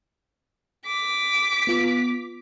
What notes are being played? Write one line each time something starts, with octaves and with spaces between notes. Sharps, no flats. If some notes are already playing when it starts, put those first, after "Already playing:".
D6 B6
B3 F4